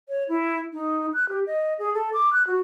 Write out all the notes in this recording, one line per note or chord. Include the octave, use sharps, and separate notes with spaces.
C#5
E4
D#4
F#6
G4
D#5
G#4
A4
D6
F#6
F#4